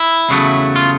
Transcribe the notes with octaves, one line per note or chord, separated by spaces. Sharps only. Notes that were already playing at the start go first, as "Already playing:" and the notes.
Already playing: E4
E2 C#3 F#3 A3
F4